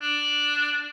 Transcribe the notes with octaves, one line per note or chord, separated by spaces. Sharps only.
D4